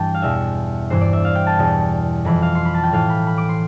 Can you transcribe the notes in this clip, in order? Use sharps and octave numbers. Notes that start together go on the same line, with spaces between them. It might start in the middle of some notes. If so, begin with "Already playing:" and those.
Already playing: G2 E3 G5 A5
F5
E2 B2 E5
G2 E3 C5
D5
E5
F5
G5
A5
E2 B2
F2 E3 B5
F5
C6
B5
A5
G5
A2 E3 F5
B5
B5
D6
C6